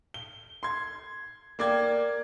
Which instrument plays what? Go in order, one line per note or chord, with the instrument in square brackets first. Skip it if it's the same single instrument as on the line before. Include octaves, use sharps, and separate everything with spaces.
[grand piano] G7
C6 G#6
A#3 D5 G5 G#6